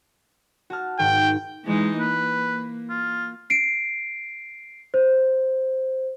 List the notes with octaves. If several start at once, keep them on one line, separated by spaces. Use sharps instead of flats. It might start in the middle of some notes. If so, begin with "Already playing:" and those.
F#4 A5 F6
G#2 D#3 G5
E3 G#3 D#4
A#3 B4
F4
C7 D7
C5